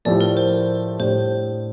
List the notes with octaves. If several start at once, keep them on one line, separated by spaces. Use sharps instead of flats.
A2 F3 A3 E4 G4 D5
A#4
C5
A2 G3 D4 G4 C5